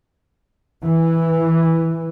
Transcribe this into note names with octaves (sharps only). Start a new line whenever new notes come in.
E3